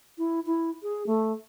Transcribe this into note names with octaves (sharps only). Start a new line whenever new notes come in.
E4
E4
G#4
A3